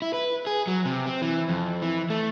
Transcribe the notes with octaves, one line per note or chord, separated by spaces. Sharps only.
E4
B4
G#4
F#3
C3
C4
E3
F2
E3
A3